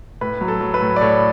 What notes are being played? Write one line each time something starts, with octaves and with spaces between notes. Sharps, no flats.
A2 B4
F#3
A4
F#3
B4
A2
D5
A2 A4 C#5